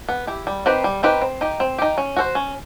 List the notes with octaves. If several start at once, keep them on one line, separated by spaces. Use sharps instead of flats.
B3
E4 G4
G3
C4 D#4 G4 B4
G3
C4 D#4 G4 B4
C4
D#4 G4
C4
D#4 G4
C#4
F#4 A4 C5
C#4